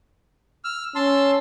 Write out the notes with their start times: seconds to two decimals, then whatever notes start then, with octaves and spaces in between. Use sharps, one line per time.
0.64 E6 F6
0.96 C#4 A5 C6 E6